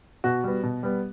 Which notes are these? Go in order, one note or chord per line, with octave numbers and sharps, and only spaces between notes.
B2 F#4
G3 B3
B2
G3 B3